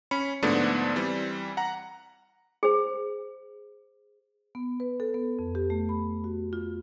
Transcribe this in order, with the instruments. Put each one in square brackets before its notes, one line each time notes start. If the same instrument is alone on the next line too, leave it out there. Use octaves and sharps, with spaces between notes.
[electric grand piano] C#4 B5 C#7
G#2 D3 F3 A3 B3 D4
E3 G3 C4
F#5 A#5
[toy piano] G#4 C5
[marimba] B3
B4
A4
B3
F2
G4
A3
B5
F#4
F4